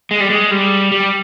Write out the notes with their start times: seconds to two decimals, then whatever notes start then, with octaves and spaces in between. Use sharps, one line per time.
0.11 G#3
0.20 G3
0.30 G#3
0.51 G3
0.92 G3